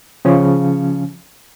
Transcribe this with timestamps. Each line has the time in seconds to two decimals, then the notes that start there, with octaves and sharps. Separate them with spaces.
0.25 C#3 F3 C#4